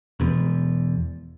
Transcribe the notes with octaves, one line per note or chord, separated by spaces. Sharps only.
E1 E2